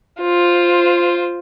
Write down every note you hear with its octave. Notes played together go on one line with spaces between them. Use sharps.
F4 C5